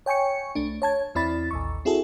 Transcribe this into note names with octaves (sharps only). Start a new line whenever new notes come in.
C#5 G5 G#5 C#6 C#7
C2 A3 D4
C#5 A5 G#6
E2 C4 E4 D5 B5 A6
A1 D#2 C#6
C4 E4 F#4 G#4 A4